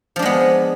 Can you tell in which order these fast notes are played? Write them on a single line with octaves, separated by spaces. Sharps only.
F3 D4 G#3 B3